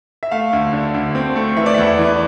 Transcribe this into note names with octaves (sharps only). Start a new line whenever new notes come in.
E5
A3 F5
D2
D3
D2
C4
A3
E3 E5
D5
E2 E5
E3